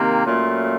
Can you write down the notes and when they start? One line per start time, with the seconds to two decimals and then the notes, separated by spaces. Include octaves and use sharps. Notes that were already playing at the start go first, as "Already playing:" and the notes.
Already playing: C3 D#3 A#3
0.25 A#2 F#3 A3 C#4 F4